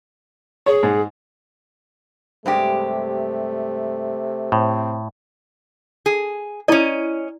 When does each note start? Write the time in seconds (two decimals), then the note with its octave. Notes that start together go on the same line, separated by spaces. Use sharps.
0.66 G#4 C#5
0.83 G#2
2.46 G2 C3 G#3 A3 G4
4.52 A2 C4
6.06 G#4
6.68 C#4 E4 D5 D#5